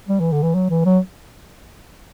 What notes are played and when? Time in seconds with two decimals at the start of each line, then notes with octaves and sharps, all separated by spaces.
0.09 G3
0.20 E3
0.32 D3
0.43 E3
0.55 F#3
0.70 E3
0.85 F#3